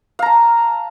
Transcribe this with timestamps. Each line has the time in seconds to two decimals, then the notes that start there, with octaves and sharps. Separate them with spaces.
0.19 F5
0.22 A#5
0.26 A5